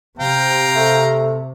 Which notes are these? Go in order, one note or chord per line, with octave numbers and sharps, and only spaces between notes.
C3 F5 G5 A#5
A3